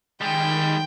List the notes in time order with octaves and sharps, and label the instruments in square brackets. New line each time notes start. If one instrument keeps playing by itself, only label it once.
[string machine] D#3 [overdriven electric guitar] G3 G#3 [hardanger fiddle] G5